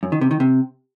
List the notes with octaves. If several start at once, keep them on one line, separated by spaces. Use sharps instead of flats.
F#2
D#3
C3
D#3
C3